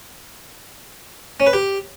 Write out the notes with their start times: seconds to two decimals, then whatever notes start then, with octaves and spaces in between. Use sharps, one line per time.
1.40 C#4
1.47 B4
1.53 G4